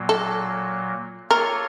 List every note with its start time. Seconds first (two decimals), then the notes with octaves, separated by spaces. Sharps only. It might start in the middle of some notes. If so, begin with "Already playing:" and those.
Already playing: A#2 F#3 A#3
0.09 A4
1.30 A#3 F4 A4 A#4 C#5